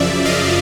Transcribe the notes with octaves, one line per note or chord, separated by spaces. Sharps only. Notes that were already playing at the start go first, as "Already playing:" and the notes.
Already playing: F#2 C#3 F3 D5 E5
D#5 F5